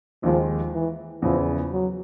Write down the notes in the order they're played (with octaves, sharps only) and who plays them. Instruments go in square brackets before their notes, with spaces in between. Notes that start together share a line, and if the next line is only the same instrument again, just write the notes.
[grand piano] D#2 D#3 G#3 [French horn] F3
[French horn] E3
[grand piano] E2 C#3 E3 [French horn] F3
[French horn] F#3